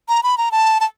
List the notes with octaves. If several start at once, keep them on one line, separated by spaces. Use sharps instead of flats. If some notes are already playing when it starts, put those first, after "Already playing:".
A#5
B5
A#5
A5
A5